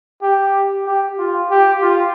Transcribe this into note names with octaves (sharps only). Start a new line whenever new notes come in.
G4
G4
F4
G4
F4